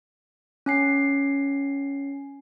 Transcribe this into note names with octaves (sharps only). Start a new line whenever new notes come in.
C#4 G#5 C7